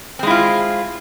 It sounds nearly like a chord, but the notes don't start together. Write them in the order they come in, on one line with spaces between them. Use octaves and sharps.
C4 G#3 E4 F4